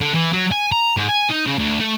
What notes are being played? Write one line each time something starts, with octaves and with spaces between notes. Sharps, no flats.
D3
E3
F#3
G#5
A#5
G#2
G#5
D#4
C#3
D2
A3